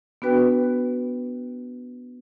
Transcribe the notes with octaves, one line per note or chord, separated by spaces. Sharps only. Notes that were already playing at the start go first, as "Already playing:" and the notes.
B3 D4 F#4 B4 G5